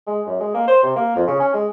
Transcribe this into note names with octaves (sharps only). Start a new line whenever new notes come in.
G#3
F#2
G#3
A#3
C5
C3
A#3
F2
C#3
C#4
G#3